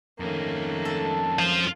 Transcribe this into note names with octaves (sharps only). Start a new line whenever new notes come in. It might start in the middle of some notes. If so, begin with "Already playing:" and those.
F2 D#3 A3 A#3 C#4
A4
F4 C5